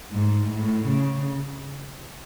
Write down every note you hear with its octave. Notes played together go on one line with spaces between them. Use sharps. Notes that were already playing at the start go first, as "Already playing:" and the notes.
G#2
A2
C#3